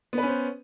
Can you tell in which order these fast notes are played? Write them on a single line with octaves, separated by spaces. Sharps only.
B3 B4 C#4 C5